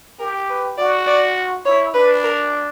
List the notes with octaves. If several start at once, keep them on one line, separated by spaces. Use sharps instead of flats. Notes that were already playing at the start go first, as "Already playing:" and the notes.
G4 A#4
B4
F#4 D5
D5
E4 C#5
D4 B4
A#4